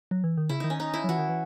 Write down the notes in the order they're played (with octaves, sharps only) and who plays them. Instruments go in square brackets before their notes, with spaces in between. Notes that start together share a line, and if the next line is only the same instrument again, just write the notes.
[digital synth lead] F#3
E3
D#3
[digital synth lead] C#3 [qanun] E4
[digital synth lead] D#3 [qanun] D#4
[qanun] C#4
D#4
E4
[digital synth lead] F#3
[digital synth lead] E3 [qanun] F#4
[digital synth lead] D#3
E3